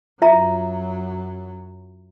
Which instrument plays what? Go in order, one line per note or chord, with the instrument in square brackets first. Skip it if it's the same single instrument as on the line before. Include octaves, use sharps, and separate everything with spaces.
[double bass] F#2 F#3 [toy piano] F4 E5 A#5